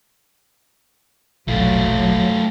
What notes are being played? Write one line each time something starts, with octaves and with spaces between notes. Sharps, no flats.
E1 A#1 F#3 A3 F4